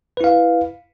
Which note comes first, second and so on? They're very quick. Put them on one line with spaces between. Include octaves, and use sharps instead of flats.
B4 E4 F5